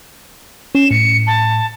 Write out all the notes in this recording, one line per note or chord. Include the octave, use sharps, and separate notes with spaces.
C#4 E7
A2 C#7
A5